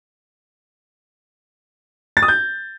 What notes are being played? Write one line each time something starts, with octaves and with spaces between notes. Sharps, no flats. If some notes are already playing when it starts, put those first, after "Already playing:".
A6
D#6
G6